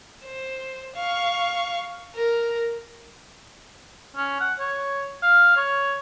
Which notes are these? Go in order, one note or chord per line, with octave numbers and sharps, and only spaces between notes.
C5
F5 C#6
A#4
C#4
F#5
C#5
F5
C#5